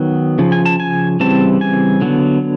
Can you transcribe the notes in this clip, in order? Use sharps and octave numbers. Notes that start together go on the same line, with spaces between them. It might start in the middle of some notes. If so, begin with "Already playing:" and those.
Already playing: D#3 F#3 B3
C#3 F3
G#5
A5
G#5
C#3 E3 G3 C4 A5
G#5
D3 F#3 B3